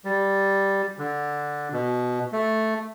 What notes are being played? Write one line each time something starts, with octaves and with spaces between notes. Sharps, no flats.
G3
D3
B2
A3